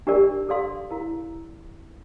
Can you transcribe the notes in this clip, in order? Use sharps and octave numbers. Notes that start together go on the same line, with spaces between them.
D4 G4 A#4 D5
A4 D5 F5 C6
E4 A#4 F5